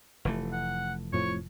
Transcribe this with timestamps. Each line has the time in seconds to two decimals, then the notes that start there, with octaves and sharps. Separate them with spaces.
0.25 F1 E3 A3
0.53 F#5
1.13 F2 A2 F3 C#5